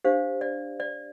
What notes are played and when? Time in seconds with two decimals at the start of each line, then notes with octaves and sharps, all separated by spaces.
0.05 D4 G4 C5 F5
0.41 D5
0.80 D5